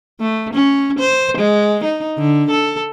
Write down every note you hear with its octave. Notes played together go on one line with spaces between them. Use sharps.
A3
C#4
C5
G#3
D#4
D3
A4